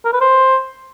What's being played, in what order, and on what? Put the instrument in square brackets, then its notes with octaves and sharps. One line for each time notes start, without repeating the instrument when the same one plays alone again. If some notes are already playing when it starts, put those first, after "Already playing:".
[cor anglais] A#4
B4
C5